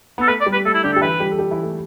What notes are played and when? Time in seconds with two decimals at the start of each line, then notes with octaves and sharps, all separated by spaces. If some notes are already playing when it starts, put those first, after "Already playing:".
0.18 B3 A4
0.27 A3 B4
0.41 D5
0.46 G3
0.53 B4
0.65 A3 A4
0.74 E4
0.83 D3 D4 G4
0.93 A4
0.96 G4
1.02 E3 E4 B4
1.20 G3 G4
1.31 A4
1.39 G3 G4
1.51 E3 E4
1.63 A3